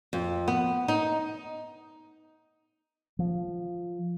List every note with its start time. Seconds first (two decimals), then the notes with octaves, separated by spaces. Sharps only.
0.13 F2
0.48 B3
0.88 D#4
3.19 F3